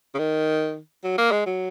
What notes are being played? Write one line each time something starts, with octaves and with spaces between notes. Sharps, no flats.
C#3
D#3
F#3
A#3
G#3
F#3